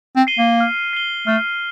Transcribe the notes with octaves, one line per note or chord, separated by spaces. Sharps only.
C4
C7 D#7 G7
A#3
F6
C7 G7
A3 F6